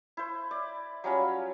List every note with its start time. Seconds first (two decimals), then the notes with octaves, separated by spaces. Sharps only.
0.17 E4 C5
0.51 D5
1.04 F#3 G3 C#4 F4